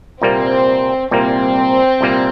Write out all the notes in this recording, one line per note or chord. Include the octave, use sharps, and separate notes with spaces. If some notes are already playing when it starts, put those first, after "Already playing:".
C2 A#2 G3 A#3 C4
C2 A#2 G3 A#3 C4
C2 A#2 G3 A#3